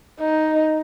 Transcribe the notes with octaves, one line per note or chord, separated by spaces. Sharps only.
D#4